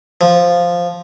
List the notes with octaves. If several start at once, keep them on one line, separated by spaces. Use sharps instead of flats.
F3